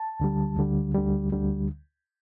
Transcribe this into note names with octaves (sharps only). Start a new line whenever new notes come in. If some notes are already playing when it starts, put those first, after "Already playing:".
Already playing: A5
D2 D3 G3
D2 D3 G3
D2 D3 G3
D2 D3 G3